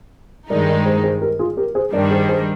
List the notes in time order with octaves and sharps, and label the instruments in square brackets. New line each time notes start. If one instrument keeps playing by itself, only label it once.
[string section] G2 D#3 G#3 D#4 [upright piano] A#4 D5
[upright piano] A#4 D5
G#4 C5
G#4 C5
G4 A#4
F4 G#4
G4 A#4
G#4 C5
[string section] G2 D#3 G3 D4 [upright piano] A#4 D5
[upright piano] G#4 C5
G#4 C5